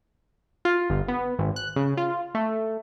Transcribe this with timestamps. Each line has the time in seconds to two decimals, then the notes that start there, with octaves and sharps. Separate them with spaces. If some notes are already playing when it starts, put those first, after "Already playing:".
0.65 F4
0.90 G1
1.08 B3
1.39 G#1
1.56 F#6
1.76 C#3
1.97 F4
2.35 A3